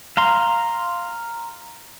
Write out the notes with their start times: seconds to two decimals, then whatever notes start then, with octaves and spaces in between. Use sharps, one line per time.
0.17 F5 A#5 C6